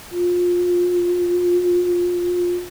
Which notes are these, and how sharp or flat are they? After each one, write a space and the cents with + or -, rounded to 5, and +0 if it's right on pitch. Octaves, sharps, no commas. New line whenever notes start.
F4 +20